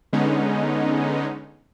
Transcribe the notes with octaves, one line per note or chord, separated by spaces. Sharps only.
D3 G#3 B3 C#4 D#4